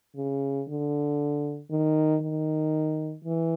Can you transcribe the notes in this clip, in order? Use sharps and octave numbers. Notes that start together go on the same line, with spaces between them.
C#3
D3
D#3
D#3
E3